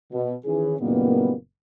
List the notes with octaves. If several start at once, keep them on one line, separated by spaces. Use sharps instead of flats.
B2
D#3 E3 C#4 G#4
F#1 A#2 D#3 G3 A#3 B3